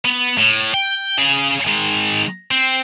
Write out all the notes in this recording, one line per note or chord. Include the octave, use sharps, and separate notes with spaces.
B3
A2
G5
C#3 G#4
D#3 G#3
C4